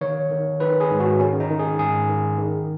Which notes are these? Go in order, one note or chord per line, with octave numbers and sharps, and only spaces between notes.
D#3 C#5
D#3
D#3 B4
G#4
G#2
F#4
D#3 C#4
D#4
D#3
G#4
G#2 G#4
D#3
D#3